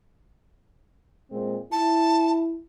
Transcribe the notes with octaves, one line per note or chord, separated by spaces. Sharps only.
A#2 G#3 C4
E4 A5